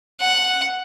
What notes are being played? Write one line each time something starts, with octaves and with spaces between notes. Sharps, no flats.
F#5